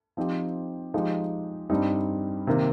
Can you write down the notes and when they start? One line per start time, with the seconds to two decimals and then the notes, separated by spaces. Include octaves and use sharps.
0.17 F3 C4 D#4 G4
0.94 F3 G#3 D#4 G4
1.70 G2 G3 C4 D#4
2.47 C3 D#3 A#3